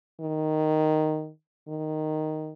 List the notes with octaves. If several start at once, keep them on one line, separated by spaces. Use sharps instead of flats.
D#3
D#3